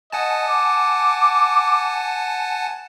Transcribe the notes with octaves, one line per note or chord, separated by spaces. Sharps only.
D#5 F#5 G#5 A5
D6